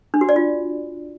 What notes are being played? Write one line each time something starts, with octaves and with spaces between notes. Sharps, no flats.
D4
F#4
D5
F4